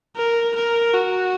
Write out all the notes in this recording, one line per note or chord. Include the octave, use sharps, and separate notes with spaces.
A#4
A#4
F#4